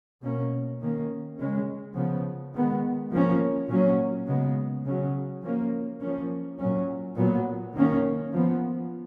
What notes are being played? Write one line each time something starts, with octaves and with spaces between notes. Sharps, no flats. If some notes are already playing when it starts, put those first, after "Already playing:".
B2 A#3 C#4
D#3 A#3 C#4
C#3 G#3 C#4
C#3 F3 B3
D#3 G#3 B3
F3 A#3 C#4
A#2 F#3 A#3 C#4
C#3 G#3 B3
C#3 F#3 C#4
F3 A#3 C#4
F3 A#3 C#4
A#2 F#3 C#4
A#2 F#3 B3
D#3 A#3 C#4
F3 B3